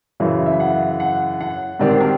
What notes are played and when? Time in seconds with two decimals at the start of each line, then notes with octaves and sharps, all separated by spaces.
0.20 F#2 C#3 E3
0.46 E5
0.60 F#5
1.00 F#5
1.41 F#5
1.80 G#2 D#3 G3 C4 D5
1.91 C5
2.01 A#4